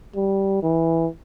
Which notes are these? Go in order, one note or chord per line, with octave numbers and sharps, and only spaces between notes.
G3
E3